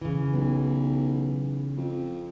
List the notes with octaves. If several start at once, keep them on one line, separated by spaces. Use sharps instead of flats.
C#3 E3
B1
F2